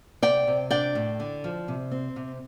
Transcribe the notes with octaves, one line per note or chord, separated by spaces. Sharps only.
C3 D5 G5
C3
D4 D5 G5
A2
D3
F3
C3
C4
C3